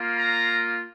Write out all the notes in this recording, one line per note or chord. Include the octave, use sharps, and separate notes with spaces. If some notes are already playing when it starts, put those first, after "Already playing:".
Already playing: A#3 F4
A#5